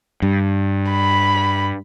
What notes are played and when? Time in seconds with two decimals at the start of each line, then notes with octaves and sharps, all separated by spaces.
0.22 G2
0.91 B5